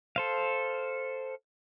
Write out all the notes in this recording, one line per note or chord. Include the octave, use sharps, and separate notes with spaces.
A4 C5 F5